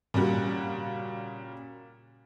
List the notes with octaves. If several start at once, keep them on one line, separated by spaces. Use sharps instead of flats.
A#2 C#3 G3 F#4